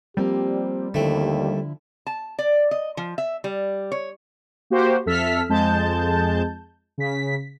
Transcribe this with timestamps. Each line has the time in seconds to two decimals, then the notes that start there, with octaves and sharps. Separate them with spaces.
0.17 F3 G3 A#3 C4 G4
0.94 D#2 D3 F3 A3 C4 E4
2.07 A5
2.39 D5
2.71 D#5
2.97 F3
3.18 E5
3.44 G3
3.92 C#5
4.70 A#3 F#4 G4 C5
5.06 F2 A4 E5 E6 F6 B6
5.49 F2 G#3 A5 G6
6.98 C#3 B6